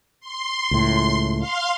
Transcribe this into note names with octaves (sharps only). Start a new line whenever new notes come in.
C6
C#2 A2
F5 C6